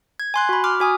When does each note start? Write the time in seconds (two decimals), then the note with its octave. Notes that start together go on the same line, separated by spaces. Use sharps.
0.20 G#6
0.34 G#5 C6 F#6
0.49 F#4 B5
0.64 D6 F6
0.80 F#4 G#5 D#6